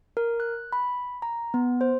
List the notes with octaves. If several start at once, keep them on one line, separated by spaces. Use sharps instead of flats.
A#4
F#6
B5
A#5
B3
C5